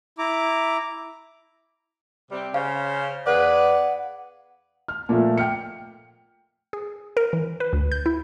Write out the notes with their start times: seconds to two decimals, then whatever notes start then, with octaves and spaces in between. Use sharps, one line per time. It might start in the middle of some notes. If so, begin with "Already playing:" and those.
0.18 E4 A#5 D6
2.32 C3 G3 C4
2.54 C#3 C#4 C5 F5
3.26 E2 G#4 B4 D5 F#5
4.88 F6
5.09 A#2 F3 A3
5.38 G5 F6 C#7
6.73 G#4
7.17 A#4
7.33 E3
7.60 B4
7.73 D2
7.92 G6
8.06 E4